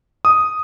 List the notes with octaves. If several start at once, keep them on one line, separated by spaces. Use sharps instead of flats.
D#6